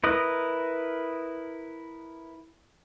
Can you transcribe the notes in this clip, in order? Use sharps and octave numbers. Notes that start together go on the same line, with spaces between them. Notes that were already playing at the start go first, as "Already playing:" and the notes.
E4 A#4 B4 D#5